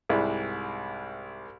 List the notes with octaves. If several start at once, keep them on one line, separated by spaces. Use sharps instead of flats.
C2 G#2 E4